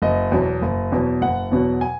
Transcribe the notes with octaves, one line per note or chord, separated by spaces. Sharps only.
F#1 D#5
E2 B2 F#3
F#1
E2 B2 F#3
F#1 F#5
E2 B2 F#3
G#5